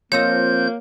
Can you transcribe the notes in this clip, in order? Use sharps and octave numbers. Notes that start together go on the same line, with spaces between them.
F3 A#3 C4 C#5 D#5 G6